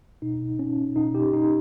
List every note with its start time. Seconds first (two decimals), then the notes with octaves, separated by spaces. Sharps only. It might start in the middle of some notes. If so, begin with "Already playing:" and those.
0.22 B2 D#4
0.59 C#4
0.96 B2 D#4
1.15 G4
1.33 D#4